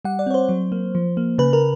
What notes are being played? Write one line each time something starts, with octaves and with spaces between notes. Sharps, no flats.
G3 F#5
D5
C4 C#5
C5
F#3
A#3
F3
A#3
C#3 B4
A#4